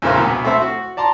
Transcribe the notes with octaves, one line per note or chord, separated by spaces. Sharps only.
E2 A#2 C#3 A#4 C5 F5
D2 B2 F#3 B3
A3 C4 C5 E5
F#4
D5 A5 A#5 C6